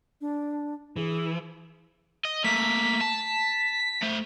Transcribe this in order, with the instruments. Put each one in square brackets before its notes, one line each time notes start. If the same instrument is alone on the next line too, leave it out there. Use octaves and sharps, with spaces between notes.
[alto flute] D4
[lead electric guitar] E3 [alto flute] G#4
[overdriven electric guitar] D#5
[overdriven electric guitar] A3 A#3 [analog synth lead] B6
[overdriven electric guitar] A5
A3 C5